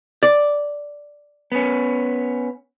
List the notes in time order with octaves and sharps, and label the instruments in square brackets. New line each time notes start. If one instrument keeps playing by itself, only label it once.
[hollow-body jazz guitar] D5
[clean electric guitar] B3 C#4